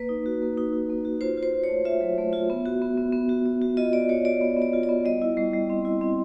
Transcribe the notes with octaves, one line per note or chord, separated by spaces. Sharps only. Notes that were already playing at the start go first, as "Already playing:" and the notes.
Already playing: A#3 B4
D#4
F#4
A#3
D#4
D#4
A#3
F#4
F4 C5
F4
C5
F4
C#5
A3
F4 E5
F#3
A3
F4
B3
F#4
B3
B3
B3
F#4
B3
F#4
F4 D#5
B3 D5
F4 C#5
F4 D5
B3
B3
D5
F4
D5
B3
G3 D#5
E4
G3
G3
C4
E4
C4